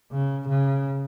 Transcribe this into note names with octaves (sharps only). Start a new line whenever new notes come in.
C#3
C#3